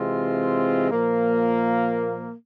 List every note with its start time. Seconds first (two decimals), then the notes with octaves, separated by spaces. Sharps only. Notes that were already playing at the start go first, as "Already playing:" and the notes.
Already playing: C3 E3 G#3 C4 F4
0.91 A#2 F3 A#3